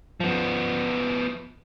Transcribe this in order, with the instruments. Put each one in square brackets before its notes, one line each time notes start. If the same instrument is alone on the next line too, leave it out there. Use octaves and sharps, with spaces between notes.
[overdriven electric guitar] F3 B3